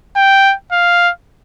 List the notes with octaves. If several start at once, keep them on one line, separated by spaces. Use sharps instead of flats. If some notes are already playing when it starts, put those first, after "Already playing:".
G5
F5